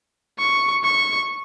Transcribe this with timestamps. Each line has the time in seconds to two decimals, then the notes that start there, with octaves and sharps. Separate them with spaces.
0.38 C#6
0.84 C#6